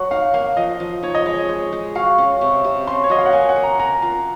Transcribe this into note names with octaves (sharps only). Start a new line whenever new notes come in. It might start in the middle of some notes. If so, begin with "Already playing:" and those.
Already playing: F#3 F#5
D#4 F5
A#3 F5
F3 D#5
F3
D#4 C#5
D#5
G#3 C#5
G#3
G#3
F#4 F5
C#4
C3
C3
C#4 C6
C#5
F#3 D#5
F5
F#5
A#3 G#5
F#5
A#3
A#5
A#4 A#5
F4